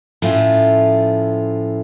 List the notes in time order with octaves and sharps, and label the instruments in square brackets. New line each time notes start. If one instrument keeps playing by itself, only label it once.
[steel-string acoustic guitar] A2 F3 A3 C#4 F4